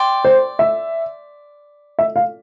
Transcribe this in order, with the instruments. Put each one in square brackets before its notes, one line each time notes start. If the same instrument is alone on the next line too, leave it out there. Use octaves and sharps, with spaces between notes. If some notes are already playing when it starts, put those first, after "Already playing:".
Already playing: [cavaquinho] D5 G5 C6
[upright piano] C5
E5
E5
F5